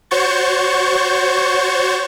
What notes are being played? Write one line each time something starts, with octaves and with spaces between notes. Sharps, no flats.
F#4 C5 C#5 C#6 G6 A6